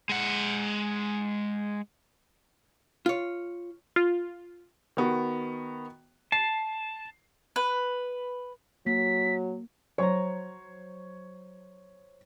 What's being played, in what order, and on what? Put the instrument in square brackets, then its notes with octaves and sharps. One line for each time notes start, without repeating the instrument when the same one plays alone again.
[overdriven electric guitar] G#3 F#5
[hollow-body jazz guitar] F4 C#5
[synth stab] F4
[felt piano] D#3 B3 F#4
[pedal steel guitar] A5 [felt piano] C7
[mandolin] B4
[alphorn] F#3 [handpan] A#3 [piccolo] B6
[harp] F#3 A#5 [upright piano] C5 C#5 C#6